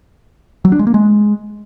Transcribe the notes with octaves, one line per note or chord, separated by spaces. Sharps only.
F#3
D4
G#3
A#3
G#3